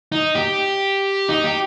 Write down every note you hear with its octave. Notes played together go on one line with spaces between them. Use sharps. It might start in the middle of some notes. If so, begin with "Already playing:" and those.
D#4
G4
D#4
G4